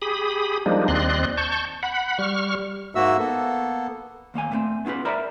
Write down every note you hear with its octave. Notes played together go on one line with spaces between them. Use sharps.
G4 G#4 B5 D#6
F3 G3 G#3 A#3 D4 D#4
D#2 C4 D5 D#5 C6 F#6
A5 C#6 G6
F#5 B5
G3 C#6 F6
G#2 A#3 F#4 E5 E6
A#3 B3 A4
D#2 A#3 C#5 G#5
A#2 A3 A#3 C4
B3 C#4 D4 F4 B4
A#4 C5 D5 E5 A#5 B5